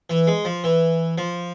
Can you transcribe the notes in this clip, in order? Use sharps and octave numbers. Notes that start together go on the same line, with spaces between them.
E3
G#3
F3
E3
F3